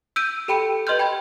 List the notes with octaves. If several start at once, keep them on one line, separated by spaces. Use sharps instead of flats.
E6 G6 D7 D#7
G4 A4 G5 B5 C#7 D#7
G4 B4 D#5 C6 F6 G6
G5 B5 G#6